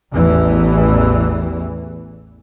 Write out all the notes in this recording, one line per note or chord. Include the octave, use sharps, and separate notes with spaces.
A1 E2 E3